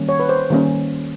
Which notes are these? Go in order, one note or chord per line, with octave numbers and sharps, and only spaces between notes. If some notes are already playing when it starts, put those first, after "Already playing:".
Already playing: D#3 G3 A#3 C#4
C#5
B4
C5
D#3 G3 A#3 C#4